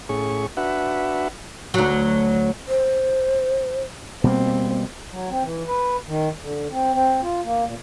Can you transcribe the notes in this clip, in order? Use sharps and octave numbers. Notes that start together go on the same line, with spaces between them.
A2 C#4 G#4 C#6
D4 F#4 B4 E5 F#5
D2 F#3
C5
B2 G3 A#3 C4
F#3
C4
E3
B4
D#3
D3
C4
C4
F4
A#3
A#2